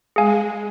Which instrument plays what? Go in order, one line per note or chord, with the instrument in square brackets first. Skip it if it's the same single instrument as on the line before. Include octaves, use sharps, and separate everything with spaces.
[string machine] G#3 [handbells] G#4 F5 G#5